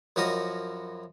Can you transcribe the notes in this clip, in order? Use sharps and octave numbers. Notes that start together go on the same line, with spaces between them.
F#2 F3 E4 F#4 A#4 D#5